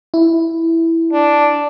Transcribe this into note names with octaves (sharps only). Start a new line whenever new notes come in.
E4
D4